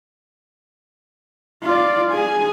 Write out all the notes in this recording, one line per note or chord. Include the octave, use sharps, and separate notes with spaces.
F4 D5
G#4 G#5